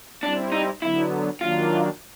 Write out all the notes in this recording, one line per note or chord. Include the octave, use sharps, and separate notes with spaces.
G3 C4 D4 E4
D#4
D3 F#3 B3 E4
D#3 F#3 A#3 D4 F4